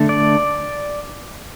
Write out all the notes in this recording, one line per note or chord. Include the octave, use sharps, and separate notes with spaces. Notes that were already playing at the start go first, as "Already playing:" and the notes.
Already playing: D3 A3 D4
D5